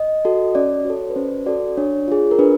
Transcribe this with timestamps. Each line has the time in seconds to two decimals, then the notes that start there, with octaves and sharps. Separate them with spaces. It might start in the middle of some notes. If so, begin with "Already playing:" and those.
Already playing: D#5
0.25 F#4 A4
0.55 C#4 D5
0.85 F#4 A4 C#5
1.10 B4
1.15 C#4 C5
1.46 F#4 A4 D5
1.77 D4 C#5
2.08 F4 G#4
2.31 A#4
2.39 D4 B4